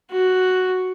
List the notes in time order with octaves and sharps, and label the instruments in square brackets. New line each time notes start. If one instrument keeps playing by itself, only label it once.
[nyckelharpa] F#4